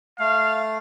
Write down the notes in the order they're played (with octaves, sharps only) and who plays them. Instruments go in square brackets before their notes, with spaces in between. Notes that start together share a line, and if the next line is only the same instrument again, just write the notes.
[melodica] A3 [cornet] F5